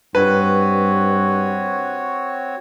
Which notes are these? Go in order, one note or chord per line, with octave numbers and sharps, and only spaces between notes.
G2 C4 F#4 B4 C#5